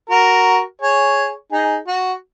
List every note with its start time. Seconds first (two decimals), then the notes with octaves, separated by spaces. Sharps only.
0.10 F#4 A#4
0.81 G#4 C#5
1.52 D#4 G#4
1.88 F#4